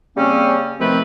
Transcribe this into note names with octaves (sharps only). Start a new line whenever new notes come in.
C#3 G3 A#3 C4 C#4
C3 D#3 F3 A3 C4 B4